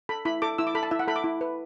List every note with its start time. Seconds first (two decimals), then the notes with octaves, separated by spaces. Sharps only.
0.09 A4 B5
0.25 E4 B5
0.42 A4 D6
0.58 E4 E6
0.67 D6
0.75 A4 B5
0.83 A5
0.91 E4 E5
0.99 F#5
1.08 A4 B5
1.16 D6
1.24 E4
1.41 B4